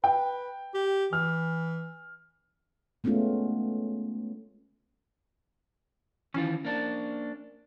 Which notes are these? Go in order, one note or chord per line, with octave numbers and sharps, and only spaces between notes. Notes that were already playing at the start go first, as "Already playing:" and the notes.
B4 G5
G4
E3 F6
G#3 A3 B3 C#4 F4
D#3 E3 C#4 F4
A#3 D4